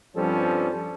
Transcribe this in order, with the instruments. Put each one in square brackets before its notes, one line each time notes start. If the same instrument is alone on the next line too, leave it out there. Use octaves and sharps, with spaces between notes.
[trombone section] G2 F3 G3 C4 C#4 A4